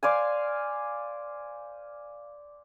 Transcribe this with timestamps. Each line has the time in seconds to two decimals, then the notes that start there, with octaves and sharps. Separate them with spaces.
0.03 C5 D5 F5 G#5